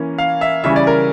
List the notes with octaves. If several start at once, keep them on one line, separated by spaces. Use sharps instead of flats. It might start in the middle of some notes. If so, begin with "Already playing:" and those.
Already playing: E3 A#3 C#4
F5
E5
C#3 E3 G3 C#4 E5
D5
A#4